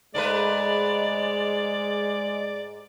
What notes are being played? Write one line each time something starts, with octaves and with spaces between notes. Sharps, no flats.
G#2 G#3 A3 B4 D5